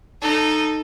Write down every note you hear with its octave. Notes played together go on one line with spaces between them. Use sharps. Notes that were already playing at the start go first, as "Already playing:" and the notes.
D#4 A4